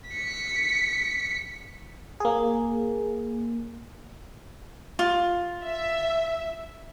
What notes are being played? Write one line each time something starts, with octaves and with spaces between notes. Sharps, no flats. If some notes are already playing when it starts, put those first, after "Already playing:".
B6 C#7
A#3 G#4
F4
E5